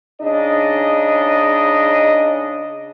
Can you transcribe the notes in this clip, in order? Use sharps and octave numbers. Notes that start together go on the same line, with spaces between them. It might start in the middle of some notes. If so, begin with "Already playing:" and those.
C#3 D4 D#4 D#5